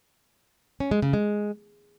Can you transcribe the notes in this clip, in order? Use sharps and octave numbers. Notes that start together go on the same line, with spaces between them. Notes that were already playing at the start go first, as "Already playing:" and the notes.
C#4
G#3
C#3
G#3